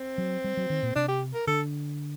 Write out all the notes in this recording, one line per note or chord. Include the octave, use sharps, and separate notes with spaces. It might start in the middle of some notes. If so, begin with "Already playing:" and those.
Already playing: C4
F#3
G3
F#3
D#3
A#2
C3 D4
G4
A#4
D3 A4